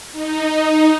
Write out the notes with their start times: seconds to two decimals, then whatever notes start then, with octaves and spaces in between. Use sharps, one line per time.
0.13 D#4